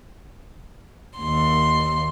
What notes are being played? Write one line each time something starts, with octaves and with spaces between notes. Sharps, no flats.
D#2 C6